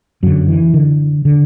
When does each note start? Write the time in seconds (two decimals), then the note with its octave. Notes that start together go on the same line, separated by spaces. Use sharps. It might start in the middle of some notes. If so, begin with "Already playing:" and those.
0.23 F#2 D3 F#3
0.48 E3
0.74 D3
1.25 D3